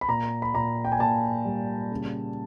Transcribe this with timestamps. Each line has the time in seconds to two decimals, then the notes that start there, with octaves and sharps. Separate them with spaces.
0.01 B5
0.08 A#2 A#5
0.42 B5
0.54 A#2 A#5
0.85 G5
0.92 G#5
0.99 A#2 A5
1.45 G3
1.92 C#3